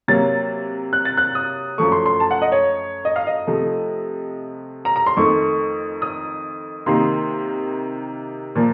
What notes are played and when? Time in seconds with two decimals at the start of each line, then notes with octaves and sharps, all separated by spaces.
0.08 C3 F#3 A#3 A6
0.93 F#6
1.05 A6
1.17 F#6
1.35 D#6
1.78 F#2 F3 A3 C#6
1.92 C6
2.06 C6
2.20 A5
2.31 F#5
2.42 D#5
2.52 C#5
3.05 D#5
3.16 F5
3.27 D#5
3.47 C3 F3 A3
4.85 A#5
4.96 A#5
5.06 C6
5.17 F2 D#3 A3 C#6
6.02 D#6
6.86 C3 D#3 A#3 C6
8.55 A#2 F3 A#3